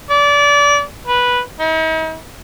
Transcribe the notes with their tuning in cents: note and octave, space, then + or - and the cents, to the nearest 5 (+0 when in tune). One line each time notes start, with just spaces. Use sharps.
D5 -25
B4 -10
D#4 +45